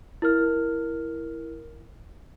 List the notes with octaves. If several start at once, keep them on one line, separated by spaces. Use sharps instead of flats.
E4 A#4 F6